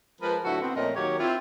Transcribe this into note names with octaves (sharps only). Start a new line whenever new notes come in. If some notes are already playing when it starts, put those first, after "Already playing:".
F3 G#3 A#4 B4
A2 D3 F#3 E4 F#4 A4
B3 C4
F2 A#2 A3 C#4 A#4 D#5
D#2 F#3 G4 A#4 C#5
C4 E4 F4